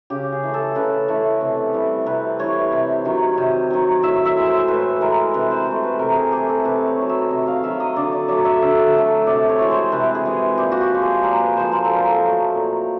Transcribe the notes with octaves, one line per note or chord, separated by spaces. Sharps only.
C#3 G4
G#4
E3 A3
A4
C#3 B4
E3 A3
C3
E3 G3
C3 B4
E3 G3 C#5
C3
D#3 F#3
C3
D#3 F#3
A2 E5
E5
E3 G#3
C5
A2 B4
E3 G#3 A#4
C3 B4
C5
E3 A3
B4
C3 A#4
G#4
E3 A3 G4
A4
C3 B4
C#5
D#3 F#3
E5
C3 D#5
F5
D#3 F#3 E5
D#5
D3 D5
D5
F#3 A3 D5
E5
D3 E5
F#3 A3
C3 D5
C#5
E3 G#3
C5
C3 B4
G#4
E3 G#3
A#2 G4
F#4
G4
F3 G#3
G#4
A#2 A#4
B4
F3 G#3 C5
A#4
A#2 A4
A#4
F#3 A3
A#2